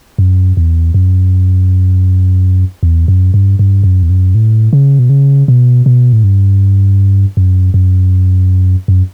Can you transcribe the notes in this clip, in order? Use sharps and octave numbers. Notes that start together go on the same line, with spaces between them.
F#2
E2
F#2
E2
F#2
G2
G2
F#2
E2
F#2
A2
C#3
B2
C#3
B2
B2
A2
G2
F#2
F#2
F#2